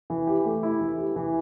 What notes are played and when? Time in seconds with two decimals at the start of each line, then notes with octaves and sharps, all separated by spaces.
0.10 E3
0.27 G4
0.45 A3
0.63 E4
0.81 E3
0.98 G4
1.16 E3